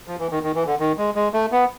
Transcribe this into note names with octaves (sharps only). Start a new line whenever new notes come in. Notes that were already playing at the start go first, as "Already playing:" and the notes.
F3
E3
D#3
D#3
E3
D3
D#3
G#3
G#3
A3
B3